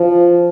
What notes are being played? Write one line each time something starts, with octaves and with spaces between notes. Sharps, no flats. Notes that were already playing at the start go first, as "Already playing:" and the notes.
Already playing: F3